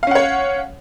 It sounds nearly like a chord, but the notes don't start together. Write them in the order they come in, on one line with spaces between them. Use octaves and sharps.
F5 C#4 F#5 C#5